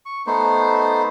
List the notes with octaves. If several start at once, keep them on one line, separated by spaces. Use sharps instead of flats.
C#6
A3 B3 D#4 C5